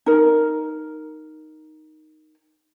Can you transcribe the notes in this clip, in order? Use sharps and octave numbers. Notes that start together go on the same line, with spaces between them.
D#4 A#4